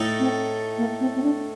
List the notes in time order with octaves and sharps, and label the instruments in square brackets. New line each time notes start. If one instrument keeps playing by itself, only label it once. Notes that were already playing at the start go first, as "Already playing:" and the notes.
Already playing: [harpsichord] A2 A3 D#4
[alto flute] C4
A#3
C4
C4
D4